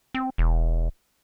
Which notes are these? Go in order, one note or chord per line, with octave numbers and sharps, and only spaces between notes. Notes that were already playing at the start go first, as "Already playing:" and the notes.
C4
E1